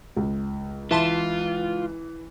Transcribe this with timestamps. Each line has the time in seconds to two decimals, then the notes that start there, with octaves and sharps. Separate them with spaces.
0.17 C#2
0.91 E3 F4 E5 A5 C6